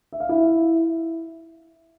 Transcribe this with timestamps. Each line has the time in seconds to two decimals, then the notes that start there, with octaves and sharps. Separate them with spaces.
0.12 E5
0.20 F5
0.29 E4 E5